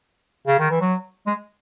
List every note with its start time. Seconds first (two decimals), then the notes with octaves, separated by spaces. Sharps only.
0.47 C#3
0.59 D#3
0.70 E3
0.81 F#3
1.26 G#3